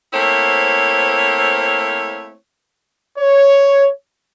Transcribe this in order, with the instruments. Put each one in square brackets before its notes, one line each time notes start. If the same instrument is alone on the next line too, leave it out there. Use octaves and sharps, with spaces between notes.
[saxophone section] A3 A#3 C4 E4 C5 C#5
[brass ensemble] C#5